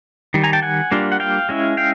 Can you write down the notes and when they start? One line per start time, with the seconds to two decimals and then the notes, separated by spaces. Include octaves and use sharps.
0.34 D#3 G3
0.43 G#5 A#5
0.53 G5 A5
0.62 F#5 G#5
0.91 G3 A#3 D4 F4
1.12 F#5
1.20 F5 G5
1.49 G#3 C#4 E4
1.77 F5 G5